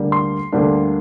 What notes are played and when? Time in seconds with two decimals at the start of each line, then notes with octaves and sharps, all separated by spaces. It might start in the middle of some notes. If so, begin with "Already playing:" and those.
Already playing: D2 D3 G3 A#3 D4
0.12 C6
0.52 D2 D3 G3 A#3 D4